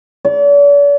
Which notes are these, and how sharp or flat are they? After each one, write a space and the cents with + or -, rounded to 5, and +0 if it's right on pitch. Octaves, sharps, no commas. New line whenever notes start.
D5 -45